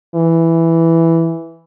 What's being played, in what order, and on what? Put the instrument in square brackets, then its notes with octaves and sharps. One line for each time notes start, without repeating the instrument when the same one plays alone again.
[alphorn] E3